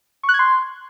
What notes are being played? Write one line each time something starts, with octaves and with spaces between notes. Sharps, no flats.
C#6
F#6
G#6
C6